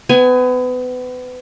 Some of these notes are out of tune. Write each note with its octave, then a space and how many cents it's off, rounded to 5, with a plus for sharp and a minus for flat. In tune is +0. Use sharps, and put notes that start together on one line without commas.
B3 +30 G#5 +0